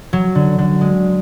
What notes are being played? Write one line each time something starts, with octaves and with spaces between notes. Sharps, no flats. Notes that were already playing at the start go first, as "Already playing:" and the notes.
F#3
D3
D3
G#3